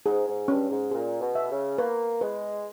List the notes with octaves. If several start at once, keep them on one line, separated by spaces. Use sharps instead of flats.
G#2 G#4
G#2
G2 C#4
G#2
A#2 G#4
B2
E5
C#3
A#3 B4
G#3 B4